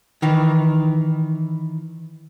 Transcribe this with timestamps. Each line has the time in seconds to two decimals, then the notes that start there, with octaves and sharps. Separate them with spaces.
0.22 D#3 E3